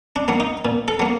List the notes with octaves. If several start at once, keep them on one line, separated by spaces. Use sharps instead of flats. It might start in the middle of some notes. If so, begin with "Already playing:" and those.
D4
F#3 A#3
D#4
A#2
A4
F#3 A#3